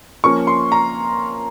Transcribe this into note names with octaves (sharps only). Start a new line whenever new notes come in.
F3 A#3 C#4 C#6
C6
A#5